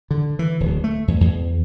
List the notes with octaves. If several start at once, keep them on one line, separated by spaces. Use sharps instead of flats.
D3
E3
D1
A3
E2
E2